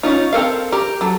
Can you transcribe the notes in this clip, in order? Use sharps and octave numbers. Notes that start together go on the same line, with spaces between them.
C#4 D#4 F4
C4 A4 A#4 F5
G4 A#4
F#3 A4